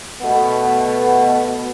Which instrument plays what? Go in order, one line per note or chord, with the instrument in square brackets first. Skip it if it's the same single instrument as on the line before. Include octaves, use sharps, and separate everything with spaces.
[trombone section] B2 A3 B3